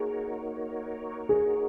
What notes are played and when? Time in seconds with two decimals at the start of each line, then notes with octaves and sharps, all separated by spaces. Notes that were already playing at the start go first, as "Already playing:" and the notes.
Already playing: A#3 D#4 F#4 G#4 A#4 C#5
1.29 G#4